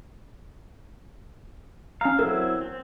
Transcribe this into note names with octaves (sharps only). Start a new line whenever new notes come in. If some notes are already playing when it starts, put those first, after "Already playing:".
C#4 F5 A#5
F#3 C4 E4 A4 A#4
C4